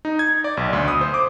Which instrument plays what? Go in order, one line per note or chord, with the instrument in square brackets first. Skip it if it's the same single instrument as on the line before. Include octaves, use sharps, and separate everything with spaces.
[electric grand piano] D#4
G#6
D5
B1
D2
D#6
C5
D6